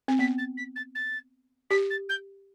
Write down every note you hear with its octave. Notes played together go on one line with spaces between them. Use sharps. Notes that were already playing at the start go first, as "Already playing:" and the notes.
C4
B3 B6
A6
B6
A6
A6
G4 B6
A6
G6